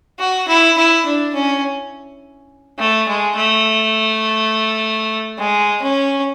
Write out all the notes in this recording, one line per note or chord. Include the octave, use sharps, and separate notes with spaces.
F#4
E4
E4
D4
C#4
A3
G#3
A3
G#3
C#4